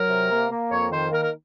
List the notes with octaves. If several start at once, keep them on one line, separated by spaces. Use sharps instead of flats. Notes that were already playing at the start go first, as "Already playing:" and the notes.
Already playing: F#3 A#4
C3
A#3
A#3
F2 C#5
D#3 C5
A#3 A#4
A#4